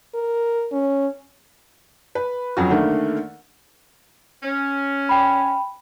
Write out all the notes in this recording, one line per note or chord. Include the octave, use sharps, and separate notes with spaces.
A#4
C#4
B4
F2 F#3 C#4 F#4
D3 D#3 A3 A#3
C#4
G5 B5